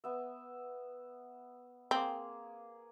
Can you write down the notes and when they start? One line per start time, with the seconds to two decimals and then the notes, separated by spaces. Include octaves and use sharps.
0.04 B3 E5
1.91 A#3 C4 G#4